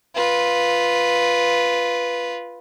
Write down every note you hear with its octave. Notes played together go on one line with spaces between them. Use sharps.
F4 B4